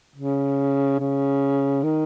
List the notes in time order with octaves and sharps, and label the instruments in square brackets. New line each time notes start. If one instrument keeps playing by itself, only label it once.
[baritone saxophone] C#3
C#3
D#3